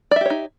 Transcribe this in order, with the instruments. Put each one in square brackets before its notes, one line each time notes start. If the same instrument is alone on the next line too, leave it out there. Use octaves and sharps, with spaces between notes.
[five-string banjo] D5
E5
G4
C#5
D#4